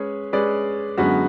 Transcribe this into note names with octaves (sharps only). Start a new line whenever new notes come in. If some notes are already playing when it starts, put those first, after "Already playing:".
Already playing: G#3 C#4 G#4 B4
G#3 C#4 G#4 B4 D5
F#2 D3 G#3 B3 F#4